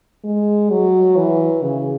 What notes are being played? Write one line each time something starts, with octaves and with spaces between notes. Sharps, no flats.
G#3
F#3
E3
C#3